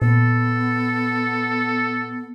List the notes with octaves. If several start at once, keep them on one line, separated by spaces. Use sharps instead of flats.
A#2 B3 A4